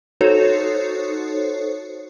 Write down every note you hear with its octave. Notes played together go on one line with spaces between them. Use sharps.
D#4 F#4 A4 C5 C#5